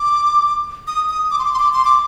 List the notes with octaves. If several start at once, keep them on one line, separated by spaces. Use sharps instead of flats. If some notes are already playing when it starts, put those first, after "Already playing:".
Already playing: D6
D#6
D#6
D6
C6
D6
C6
D6
C6
D6